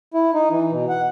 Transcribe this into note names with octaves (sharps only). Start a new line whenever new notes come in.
E4
D#4
E3
B2
F#5